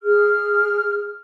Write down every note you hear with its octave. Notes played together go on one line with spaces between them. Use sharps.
G#4 F6